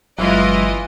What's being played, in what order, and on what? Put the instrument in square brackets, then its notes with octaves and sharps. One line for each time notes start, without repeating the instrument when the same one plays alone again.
[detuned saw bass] G1 [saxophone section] E3 [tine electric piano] F#3 G#3 [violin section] E4 F4 D#5